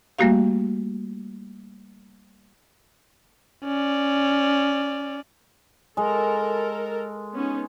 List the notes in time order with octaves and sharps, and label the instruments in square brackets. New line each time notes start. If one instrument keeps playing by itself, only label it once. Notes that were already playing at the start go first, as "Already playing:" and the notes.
[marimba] G3 A3 A#3 F#4 G4 F5
[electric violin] C#4 D5
[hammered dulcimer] G#3 [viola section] A4 A#4
[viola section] B3 C#4 D#4